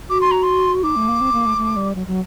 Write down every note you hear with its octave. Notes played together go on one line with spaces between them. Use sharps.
F#4 D6
C6
A#5
C6
D#4 D6
A3
A#3
C4
A#3
A3
A3
G3
F#3
F#3